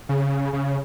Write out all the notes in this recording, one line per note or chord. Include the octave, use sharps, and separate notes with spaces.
C#3
C#3